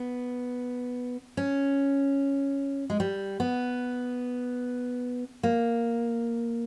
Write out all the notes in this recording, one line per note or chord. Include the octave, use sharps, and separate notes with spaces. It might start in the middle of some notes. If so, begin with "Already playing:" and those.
Already playing: B3
C#4
G#3
G3
B3
A#3